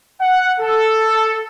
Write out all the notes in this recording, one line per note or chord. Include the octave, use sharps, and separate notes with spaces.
F#5
A4